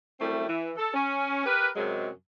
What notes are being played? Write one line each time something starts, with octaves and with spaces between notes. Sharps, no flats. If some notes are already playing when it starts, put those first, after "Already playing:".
F#2 G3 A3 C4 E4
E3
A4
C#4
G4 A#4 B4
F#2 C3 F#3 G#3